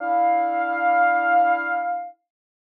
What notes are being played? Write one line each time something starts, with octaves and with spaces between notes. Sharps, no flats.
D4 E4 F5